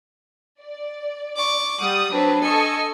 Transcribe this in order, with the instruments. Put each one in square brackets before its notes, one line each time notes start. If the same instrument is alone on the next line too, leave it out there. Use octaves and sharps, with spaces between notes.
[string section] D5
[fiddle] C#6 D6
[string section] G3 D#6 [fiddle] F#5
[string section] F#3 C4 B4 [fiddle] D4
[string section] A4 D#5 C#6 [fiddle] G#5